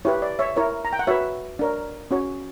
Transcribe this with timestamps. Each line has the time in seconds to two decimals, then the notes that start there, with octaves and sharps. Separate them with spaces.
0.05 E4 G4 B4 C#5
0.22 D5
0.39 C#5 E5
0.57 E4 A#4 C#5
0.85 A#5
0.93 G5
0.99 F#5
1.07 F#4 B4 C#5 E5
1.59 D4 A#4 C#5
2.11 C#4 F#4 C#5